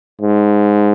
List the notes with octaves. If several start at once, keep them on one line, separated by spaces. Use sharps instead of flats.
G#2